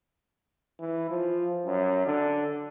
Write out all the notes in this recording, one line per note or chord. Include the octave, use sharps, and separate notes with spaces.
E3
F3
F#2
D3